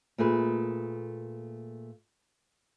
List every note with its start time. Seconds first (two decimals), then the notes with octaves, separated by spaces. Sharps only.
0.18 A#2 A3 G#4 B4